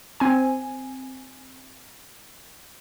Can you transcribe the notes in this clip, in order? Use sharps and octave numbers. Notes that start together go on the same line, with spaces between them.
C4 G#5